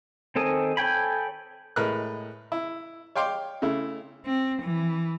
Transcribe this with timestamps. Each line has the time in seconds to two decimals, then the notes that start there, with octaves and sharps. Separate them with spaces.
0.36 D#3 C4 A4 G#5 D#6
0.77 A4 C#5 G5 G#5 B5
1.76 A2 G#3 A#4 B4 F6 F#6
2.52 E4
3.15 C#5 F5 G5 C6 D6
3.62 C#3 A3 E4
4.26 C4
4.62 E3